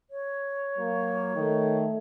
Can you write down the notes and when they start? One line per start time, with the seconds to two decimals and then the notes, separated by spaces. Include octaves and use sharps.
0.10 C#5
0.77 F#3 A#3
1.35 D#3 A3